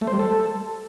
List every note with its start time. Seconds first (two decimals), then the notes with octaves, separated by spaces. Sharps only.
0.01 A3
0.07 C5
0.13 G3
0.19 A4